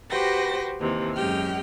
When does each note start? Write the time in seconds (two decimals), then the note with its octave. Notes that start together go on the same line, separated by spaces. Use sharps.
0.10 F#4 G4 B4 C5 G5 A#6
0.81 D#2 C3 E3
1.15 F#2 G#3 G4 G5 F6